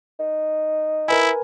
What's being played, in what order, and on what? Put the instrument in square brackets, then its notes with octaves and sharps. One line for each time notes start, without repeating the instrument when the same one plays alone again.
[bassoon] D#4
[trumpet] E4 [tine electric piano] A#4 B4 G#5